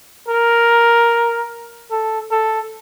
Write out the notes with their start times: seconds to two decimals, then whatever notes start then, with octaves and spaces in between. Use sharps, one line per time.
0.28 A#4
1.91 A4
2.32 A4